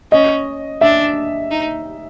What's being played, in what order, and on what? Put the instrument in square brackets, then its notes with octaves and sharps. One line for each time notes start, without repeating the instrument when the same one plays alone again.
[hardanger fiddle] C#4 [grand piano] D#5
[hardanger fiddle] D4 [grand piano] E5
[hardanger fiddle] D#4